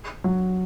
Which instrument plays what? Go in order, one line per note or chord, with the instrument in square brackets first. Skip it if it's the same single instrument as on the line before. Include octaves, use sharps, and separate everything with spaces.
[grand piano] F#3